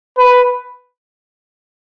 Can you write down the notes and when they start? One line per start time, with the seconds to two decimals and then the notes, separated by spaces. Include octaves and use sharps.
0.18 B4